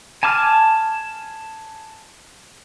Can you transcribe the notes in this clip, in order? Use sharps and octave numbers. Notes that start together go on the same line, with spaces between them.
G#5 A5 D6 F6